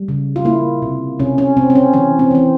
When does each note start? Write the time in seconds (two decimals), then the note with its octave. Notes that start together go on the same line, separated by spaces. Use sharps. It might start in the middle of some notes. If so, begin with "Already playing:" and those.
Already playing: G3
0.08 C#3
0.36 F4
0.45 A#3 E4
0.82 C3
1.20 C3 C#4
1.38 C#4
1.57 C3 C4
1.70 C4
1.75 C#4
1.93 E3 C#4
2.19 C4
2.31 E3 C4